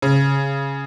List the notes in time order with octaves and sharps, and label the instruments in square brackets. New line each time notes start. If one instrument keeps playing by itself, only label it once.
[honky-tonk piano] C#3